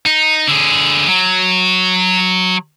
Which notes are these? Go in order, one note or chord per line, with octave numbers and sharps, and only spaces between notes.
D#4
D3 G#4
F#3